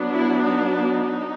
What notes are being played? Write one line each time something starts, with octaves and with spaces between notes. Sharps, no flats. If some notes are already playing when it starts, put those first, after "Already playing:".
Already playing: F#3 B3 D4
E4
D#4
D#4